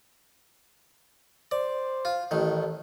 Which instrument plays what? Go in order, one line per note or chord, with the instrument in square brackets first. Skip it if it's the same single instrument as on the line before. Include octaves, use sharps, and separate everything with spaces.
[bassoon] C5 [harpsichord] D5
[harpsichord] F4
[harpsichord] A1 D#3 [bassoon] A2